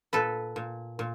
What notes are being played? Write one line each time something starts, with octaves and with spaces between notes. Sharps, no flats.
A#2 A4 B4
A#2
A#2